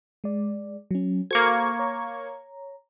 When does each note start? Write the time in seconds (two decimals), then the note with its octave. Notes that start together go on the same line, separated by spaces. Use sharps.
0.24 G#3 D5
0.91 F#3 C#4
1.31 A#3 F#4 A4 C5 C#6 G#6
1.79 C#5 A#5